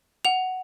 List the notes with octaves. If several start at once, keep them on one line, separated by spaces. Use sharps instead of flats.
F#5 F7